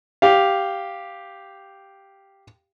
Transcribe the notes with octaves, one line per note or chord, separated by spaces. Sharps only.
G4 F5